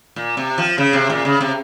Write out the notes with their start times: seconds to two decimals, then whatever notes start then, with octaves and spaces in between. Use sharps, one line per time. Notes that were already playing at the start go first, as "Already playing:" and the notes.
0.16 A#2
0.37 C3
0.58 F3
0.78 C#3
0.93 C3
1.10 A#2
1.25 C#3
1.41 C3